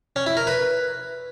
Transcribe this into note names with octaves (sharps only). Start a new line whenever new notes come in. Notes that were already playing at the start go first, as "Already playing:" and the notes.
C#4
E4
A#4
B4